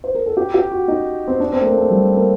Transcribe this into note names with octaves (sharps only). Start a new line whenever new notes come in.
C5
A#4
A4
G4
G4
F#4
D#4
C4
D4
C4
A3
A#3
A3
G3
A#3